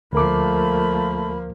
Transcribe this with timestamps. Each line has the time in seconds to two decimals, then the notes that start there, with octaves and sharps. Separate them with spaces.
0.13 D2 F3 A3 A#3 A#4 B5 D6